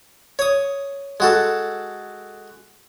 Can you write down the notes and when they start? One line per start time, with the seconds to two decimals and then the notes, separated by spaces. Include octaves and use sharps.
0.39 C#5 D#6
1.20 G#3 F#4 A4